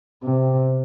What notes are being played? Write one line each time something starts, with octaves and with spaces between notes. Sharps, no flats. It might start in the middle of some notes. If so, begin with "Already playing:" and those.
C3